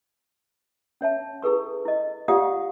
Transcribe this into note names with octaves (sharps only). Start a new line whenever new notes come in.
C#4 C#5 E5 A5
E4 G#4 A4 B4 C#6
E4 D#5
F4 G4 D5 F5 F#5 D#6